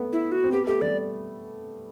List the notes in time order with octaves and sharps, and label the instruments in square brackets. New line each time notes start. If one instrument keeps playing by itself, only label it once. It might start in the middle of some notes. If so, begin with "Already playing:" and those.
Already playing: [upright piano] A3 B3
[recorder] E4
F#4
[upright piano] C4
[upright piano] B3 [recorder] G4
[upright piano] A3 [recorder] G4
[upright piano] G3 [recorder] D5